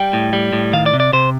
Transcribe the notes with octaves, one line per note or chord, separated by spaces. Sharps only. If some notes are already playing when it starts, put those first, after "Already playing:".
Already playing: G3 G5
A2
G3
A2
D#3 F5
D5
C3
D5
C3 C5